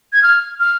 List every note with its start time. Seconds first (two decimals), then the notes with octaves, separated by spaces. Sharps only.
0.13 G#6
0.23 F6
0.60 F6